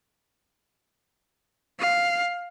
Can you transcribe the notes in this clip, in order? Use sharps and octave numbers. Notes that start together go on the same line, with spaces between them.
F5